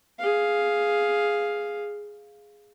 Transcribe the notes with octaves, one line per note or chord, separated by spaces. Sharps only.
G#4 F5